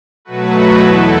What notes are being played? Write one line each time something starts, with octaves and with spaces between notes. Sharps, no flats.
B2 F#3 A3 F#4 B4
E2 E3 B3 E4 A4